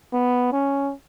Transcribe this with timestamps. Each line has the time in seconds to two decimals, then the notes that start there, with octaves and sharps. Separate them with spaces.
0.14 B3
0.53 C#4